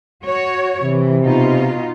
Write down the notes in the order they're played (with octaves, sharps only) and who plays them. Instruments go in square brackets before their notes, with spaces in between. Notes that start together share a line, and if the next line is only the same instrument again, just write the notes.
[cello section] F#4 C#5
[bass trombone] C3 [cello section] E3
[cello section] B2 D#4 F4